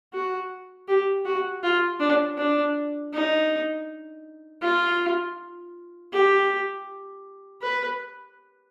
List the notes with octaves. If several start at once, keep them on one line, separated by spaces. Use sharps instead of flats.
F#4
G4
F#4
F4
D4
D4
D#4
F4
G4
B4